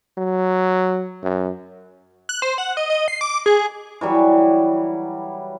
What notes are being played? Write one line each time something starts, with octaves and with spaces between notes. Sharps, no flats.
F#3
F#2
F#6
C5
F#5
D#5
D#5
C7
D6
G#4
E3 F#3 G3